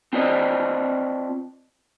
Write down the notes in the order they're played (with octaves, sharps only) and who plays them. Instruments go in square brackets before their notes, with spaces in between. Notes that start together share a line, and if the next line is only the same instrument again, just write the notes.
[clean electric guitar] C4 F4 C5 D5 D#5